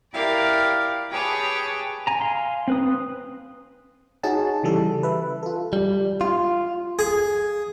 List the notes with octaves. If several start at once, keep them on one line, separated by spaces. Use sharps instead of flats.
E4 G4 A#4 D5 F5
G4 G#4 B4 C#5 G5 A5
G#5 A#5
F5 G#5 C6
C4 B4 D#6
D#4 F#4 G#4 C#5 A5
C#3 E3 G3 A4
B4 E5
F4 A4
G3
F4
G#4